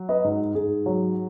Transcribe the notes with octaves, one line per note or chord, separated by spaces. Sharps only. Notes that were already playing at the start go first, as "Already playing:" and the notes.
Already playing: F#3
B4 D#5
G#2
G#2 G#4
F#3